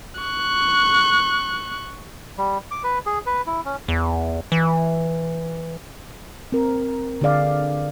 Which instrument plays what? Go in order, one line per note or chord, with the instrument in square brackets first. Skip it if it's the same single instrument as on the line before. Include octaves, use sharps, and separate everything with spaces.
[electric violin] C#6 F#6
[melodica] G3
D6
B4
G#4
B4
E4
C#4
[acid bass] E2
E3
[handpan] C4 A#4
D3 D4 G#4 D5 F5